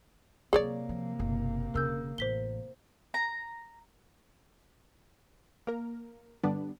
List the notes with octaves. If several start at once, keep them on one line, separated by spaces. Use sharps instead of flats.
C3 F#3 A#3 F4 G#4 C#5 D5
F3
F#1 B2
E1 C#3 A#4 E6 G6
A1 C5 B6 G7
A#5
A#3 A#4
G2 D3 G3 B3 D4